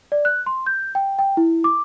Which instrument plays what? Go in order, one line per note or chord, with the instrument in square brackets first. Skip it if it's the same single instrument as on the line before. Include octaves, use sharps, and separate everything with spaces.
[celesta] D5
F#6
C6
G6
G5
G5
E4
D6